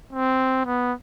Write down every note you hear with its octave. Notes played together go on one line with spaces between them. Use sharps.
C4
B3